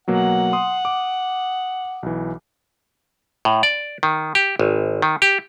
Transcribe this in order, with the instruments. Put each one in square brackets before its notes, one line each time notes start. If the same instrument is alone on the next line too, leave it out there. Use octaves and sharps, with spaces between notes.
[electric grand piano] B2 F#3 A#3 [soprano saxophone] F#5
[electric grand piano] C6 D#6
D6
B1 E3
[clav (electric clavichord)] A2
D5
D#3
G4
G#1
D#3
G4